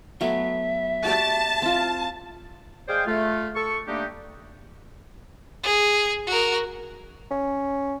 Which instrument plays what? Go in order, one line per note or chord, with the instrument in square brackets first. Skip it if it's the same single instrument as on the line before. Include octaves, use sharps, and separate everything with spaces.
[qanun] F#3 A3 B3 [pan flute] E5
[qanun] F#4 G4 D5 [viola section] A5
[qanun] C4 F4
[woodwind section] G#3 G#4 C5 D5 F5 G5
A3 F4
A4 C#6
G3 A3 A#3 D4 D#4 G4
[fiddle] G#4
F#4 A#4
[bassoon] C#4